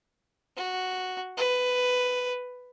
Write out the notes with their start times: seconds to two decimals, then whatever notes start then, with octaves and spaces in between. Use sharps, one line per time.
0.57 F#4
1.37 B4